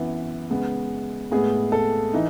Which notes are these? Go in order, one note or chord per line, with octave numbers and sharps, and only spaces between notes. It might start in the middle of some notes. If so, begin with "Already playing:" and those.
Already playing: F#2 E3 B3
C#3 G#3 B3
A2 G#3 B3 G#4
A4
E3 D#4